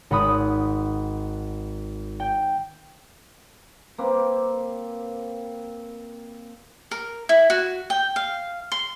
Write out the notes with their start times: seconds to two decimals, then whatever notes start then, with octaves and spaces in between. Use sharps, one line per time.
0.11 G#1 F#5 B5 D#6
2.20 G5
3.98 A#3 C4 B4
6.91 A#4
7.29 E4
7.50 F#4
7.90 G5
8.16 F5
8.72 C6